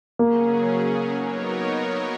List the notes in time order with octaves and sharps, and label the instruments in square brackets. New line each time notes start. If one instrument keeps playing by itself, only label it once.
[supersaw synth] C#3 F#3 C#4 G#4 [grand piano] A#3
[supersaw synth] F#3 B3 D#4 A#4 C#5